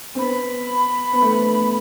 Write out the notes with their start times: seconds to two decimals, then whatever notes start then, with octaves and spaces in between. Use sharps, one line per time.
0.15 C4
0.19 B3 B5
1.13 B3
1.22 A3
1.31 B3